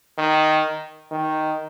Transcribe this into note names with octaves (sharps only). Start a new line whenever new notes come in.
D#3
D#3